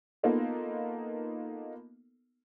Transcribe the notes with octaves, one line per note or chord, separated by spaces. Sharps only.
A#3 B3 D#4 F4 A4